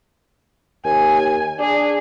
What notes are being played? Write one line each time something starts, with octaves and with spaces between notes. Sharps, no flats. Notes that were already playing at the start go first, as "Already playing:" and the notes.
D#2 G#5
D4 G#4